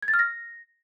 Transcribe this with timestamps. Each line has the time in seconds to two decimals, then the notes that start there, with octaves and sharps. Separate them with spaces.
0.03 G#6
0.08 A6
0.14 F6
0.19 A#6